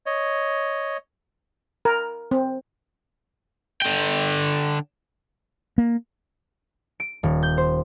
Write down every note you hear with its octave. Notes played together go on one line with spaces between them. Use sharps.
C#5 D#5
A#4
C4
D3 G5
A#3
D7
D#1
G6
C5